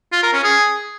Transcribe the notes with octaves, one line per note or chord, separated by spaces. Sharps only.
F4
A#4
C#4
G#4